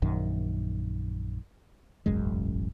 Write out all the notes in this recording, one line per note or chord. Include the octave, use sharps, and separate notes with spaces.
A#1 F#2 D#3
E1 A1 F#2 G#3